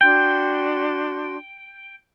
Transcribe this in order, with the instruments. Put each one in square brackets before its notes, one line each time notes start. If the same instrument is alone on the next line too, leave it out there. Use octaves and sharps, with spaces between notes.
[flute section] D4 F#4 C6 [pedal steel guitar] G5